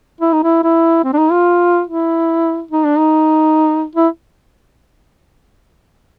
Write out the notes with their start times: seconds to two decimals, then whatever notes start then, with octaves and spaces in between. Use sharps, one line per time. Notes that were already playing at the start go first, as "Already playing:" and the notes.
0.21 E4
0.32 D#4
0.43 E4
0.63 E4
1.04 C4
1.13 D4
1.18 D#4
1.31 F4
1.87 E4
2.71 D#4
2.84 D4
2.98 D#4
3.95 E4